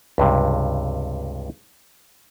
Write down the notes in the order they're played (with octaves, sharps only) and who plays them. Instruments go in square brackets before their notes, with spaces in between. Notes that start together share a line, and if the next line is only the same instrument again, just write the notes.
[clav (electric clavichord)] C#2 G2 C3